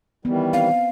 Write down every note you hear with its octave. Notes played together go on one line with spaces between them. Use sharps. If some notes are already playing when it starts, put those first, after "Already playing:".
D#3 E3 G3 B3
C4 F5